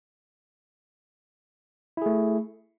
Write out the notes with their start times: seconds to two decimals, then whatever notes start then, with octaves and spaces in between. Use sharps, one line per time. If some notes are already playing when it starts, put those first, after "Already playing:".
1.97 E4
2.02 G#4
2.06 A3